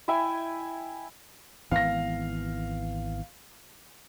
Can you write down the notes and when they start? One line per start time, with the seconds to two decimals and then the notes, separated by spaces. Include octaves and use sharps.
0.08 E4 E5 G5 G#5
1.71 G#1 E3 B3 F5 A#6